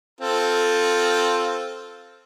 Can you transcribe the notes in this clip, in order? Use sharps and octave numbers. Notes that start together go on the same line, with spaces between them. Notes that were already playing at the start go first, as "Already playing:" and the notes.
C4 F4 A4